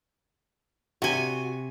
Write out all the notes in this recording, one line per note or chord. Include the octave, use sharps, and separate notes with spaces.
C3 F#4 G#5